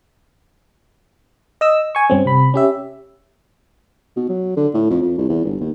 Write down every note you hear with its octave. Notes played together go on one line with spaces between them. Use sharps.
D#5 E6
G#5 C#6
G2 C4 C#4
C3 B5
C#4 G4 E5
B2
F#3
D3
A2
F2
F2
C2
E2
G1
D#2